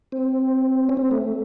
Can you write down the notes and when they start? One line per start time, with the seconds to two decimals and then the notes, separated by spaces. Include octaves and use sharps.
0.12 C4
0.89 C#4
0.97 C4
1.11 A3